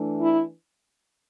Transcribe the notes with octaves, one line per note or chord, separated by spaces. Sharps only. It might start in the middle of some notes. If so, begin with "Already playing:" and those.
Already playing: E3 A3 D4
E4